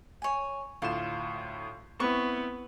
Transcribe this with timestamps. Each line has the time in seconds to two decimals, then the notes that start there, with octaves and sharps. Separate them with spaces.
0.22 C#5 G#5
0.82 D2 A2 F4 E7
2.00 B3 C4 E4 C#6